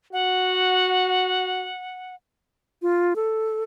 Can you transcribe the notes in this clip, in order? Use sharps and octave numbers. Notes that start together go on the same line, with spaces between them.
F#4 F#5
F4
A4